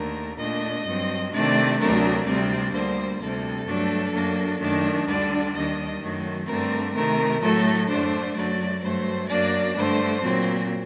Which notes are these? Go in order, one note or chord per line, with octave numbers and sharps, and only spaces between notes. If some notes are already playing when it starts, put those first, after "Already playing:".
Already playing: D#2 D3 A3 A#4
A#2 A3 D4 D#5
G2 F#3 C4
C3 D#3 A3 D4 D5
D2 C3 F#3 A3 D4 A#4
D2 C3 G3 C4 D5
D2 D3 G3 A#3 C5
D2 C3 G3 A4
G2 F#3 A3 D4
F#2 F#3 A#3 D4
F#2 D#3 A3 D4
D2 D3 G3 D4 D5
D#2 D#3 G3 D4 D#5
F#2 D#3 F#3 A3
G2 D3 A3 C4 A#4
C3 D#3 A3 A#4
A2 F#3 A3 A4
F#2 D3 A3 D4 C5
F#2 F#3 A3 D5
G2 F#3 A3 C5
F#2 F#3 A#3 D4 D5
G2 D3 A3 C5
A#2 F#3 C4